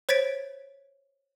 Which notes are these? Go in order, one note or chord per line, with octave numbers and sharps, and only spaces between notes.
C5 C#5 G#6 A6 B6 D7